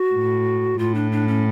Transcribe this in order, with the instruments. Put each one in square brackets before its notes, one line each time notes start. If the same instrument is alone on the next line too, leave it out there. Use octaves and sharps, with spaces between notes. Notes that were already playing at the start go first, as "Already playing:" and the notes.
Already playing: [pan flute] F#4
[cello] A2
[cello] A2 [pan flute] F4
[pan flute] D4
D4
C#4